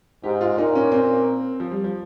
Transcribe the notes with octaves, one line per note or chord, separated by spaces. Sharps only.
G#2 G4
F4
A#2 D#4
C#4
C4
F3
G3
F3